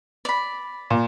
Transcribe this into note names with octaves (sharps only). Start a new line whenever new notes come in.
D5 B5
A#2